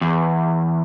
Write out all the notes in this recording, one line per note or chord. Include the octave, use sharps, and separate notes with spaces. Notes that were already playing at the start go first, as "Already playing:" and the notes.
E2